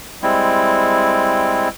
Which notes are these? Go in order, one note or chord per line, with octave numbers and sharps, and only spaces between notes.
G3 G#3 C4 E4